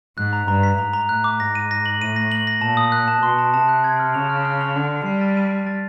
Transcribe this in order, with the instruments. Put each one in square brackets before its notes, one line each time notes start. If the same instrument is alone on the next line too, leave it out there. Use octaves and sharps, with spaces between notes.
[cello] G#2 [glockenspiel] F#6
[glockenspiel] A#5
[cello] G2 [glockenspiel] A#5
[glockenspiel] B6
[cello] G#2 [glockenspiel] A#5
[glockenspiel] A#5
[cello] A2 [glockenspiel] F#6
[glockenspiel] D6
[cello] G#2 [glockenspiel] A#6
[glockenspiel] D#7
A#6
F#7
[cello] A2 [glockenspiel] D#7
[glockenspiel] A#6
F#7
A#6
[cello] A#2 [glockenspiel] A5
[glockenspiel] D#6
F#6
A5
[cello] B2 [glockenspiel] C6
[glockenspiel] A5
[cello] C3 [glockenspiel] A5
[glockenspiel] F#6
G#6
F6
[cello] C#3 [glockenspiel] F7
[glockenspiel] F6
F6
F7
[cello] D3 [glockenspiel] C#7
[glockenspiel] C#7
[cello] G3 [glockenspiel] C7
[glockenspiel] A6
D#7
C7
A6